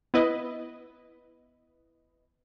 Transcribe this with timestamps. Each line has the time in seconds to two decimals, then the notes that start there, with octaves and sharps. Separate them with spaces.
0.14 B3 E4 B4 D#5